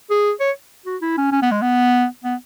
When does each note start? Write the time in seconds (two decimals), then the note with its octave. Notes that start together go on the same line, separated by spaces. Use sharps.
0.10 G#4
0.40 C#5
0.86 F#4
1.02 E4
1.17 C#4
1.32 C#4
1.42 B3
1.51 G#3
1.62 B3
2.24 B3